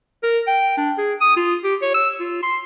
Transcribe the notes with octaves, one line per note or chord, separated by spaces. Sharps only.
A#4
G5
D4
G#4
D#6
F4
G4
C#5
E6
F4
C6